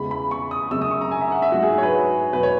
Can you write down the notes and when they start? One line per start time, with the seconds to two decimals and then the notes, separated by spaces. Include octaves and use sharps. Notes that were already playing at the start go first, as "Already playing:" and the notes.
Already playing: E2 C#3 G#3 B5
0.11 B5
0.31 C#6
0.51 D#6
0.71 F#2 C#3 G#3 E6
0.82 D#6
0.91 C#6
1.01 A#5
1.11 G#5
1.21 E5
1.32 F#5
1.42 E5
1.52 G#2 F#3 F#4
1.63 G#4
1.73 G#4
1.78 C#5
1.83 B4
2.32 E2 B2 F#3 B4
2.43 C#5